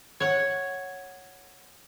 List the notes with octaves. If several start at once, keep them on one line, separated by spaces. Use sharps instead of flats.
C#5 F#5